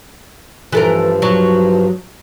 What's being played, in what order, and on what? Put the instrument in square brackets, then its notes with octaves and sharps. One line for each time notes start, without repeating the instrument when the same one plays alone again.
[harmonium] G2 F3 [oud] E3 A4 A#4
[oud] F#3